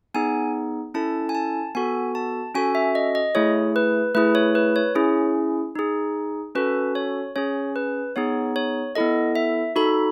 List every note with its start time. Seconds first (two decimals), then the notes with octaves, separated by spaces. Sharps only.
0.14 B3 D#4 G#4 G#5
0.94 C#4 E4 A4 A5
1.29 G#5
1.35 A5
1.75 B3 F#4 A4 G#5
2.15 A5
2.55 C#4 F#4 A4 G#5
2.75 E5
2.95 D#5
3.15 D#5
3.35 A3 E4 G#4 C#5
3.76 B4
4.15 A3 E4 G#4 B4
4.35 C#5
4.55 B4
4.76 C#5
4.95 C#4 E4 G#4
5.76 D#4 G#4
6.55 C#4 F#4 A4 B4
6.95 C#5
7.36 C#4 G#4 C#5
7.76 B4
8.16 B3 D#4 G#4 C#5
8.56 C#5
8.95 B3 E4 A4 D#5
9.35 E5
9.76 D#4 F#4 A4 B5